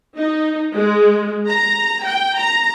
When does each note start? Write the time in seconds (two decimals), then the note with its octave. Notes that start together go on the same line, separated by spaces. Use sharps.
0.17 D#4
0.74 G#3
1.50 A#5
2.06 G5
2.39 A#5